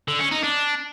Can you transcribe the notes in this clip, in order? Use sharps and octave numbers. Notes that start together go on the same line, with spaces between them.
D3
C#4
D#4
D4